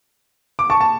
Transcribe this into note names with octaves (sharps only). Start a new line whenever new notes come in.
D6
A5 C#6
A5